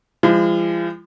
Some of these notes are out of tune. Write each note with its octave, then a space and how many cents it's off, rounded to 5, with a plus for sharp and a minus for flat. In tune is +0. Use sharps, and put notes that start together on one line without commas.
F3 -40 G#3 -45